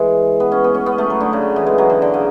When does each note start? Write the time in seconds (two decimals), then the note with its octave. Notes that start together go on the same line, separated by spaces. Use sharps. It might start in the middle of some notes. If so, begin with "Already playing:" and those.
Already playing: E3 G#3
0.40 B3
0.52 C#4
0.64 B3
0.74 C#4
0.86 B3
0.98 A3
1.10 F#3
1.21 D3
1.33 C#3
1.56 E3
1.67 G#3
1.78 F#3
1.90 D3
2.02 D3
2.14 C#3